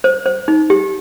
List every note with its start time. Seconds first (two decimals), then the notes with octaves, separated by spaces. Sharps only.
0.04 C5
0.26 C5
0.48 D#4
0.70 G4